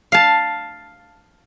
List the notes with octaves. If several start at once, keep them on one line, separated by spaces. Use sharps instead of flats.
F5 A5